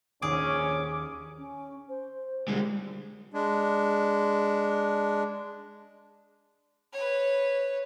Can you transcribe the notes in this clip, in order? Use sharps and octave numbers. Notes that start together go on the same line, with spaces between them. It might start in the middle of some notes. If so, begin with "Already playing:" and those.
A#1 D#2 C#4 G#4 D6
C#4
C5
D3 G3 G#3
G#3 D4
B4 C#5